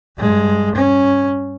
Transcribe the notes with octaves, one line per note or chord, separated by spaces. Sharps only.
G2 G#3
C#4